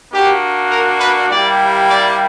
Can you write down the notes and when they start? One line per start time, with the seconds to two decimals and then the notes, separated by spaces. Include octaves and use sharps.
0.12 A#3 D4 F#4 G4
0.70 A#4
1.00 B4
1.29 G3 A#3 E4 G4 D5
1.89 D5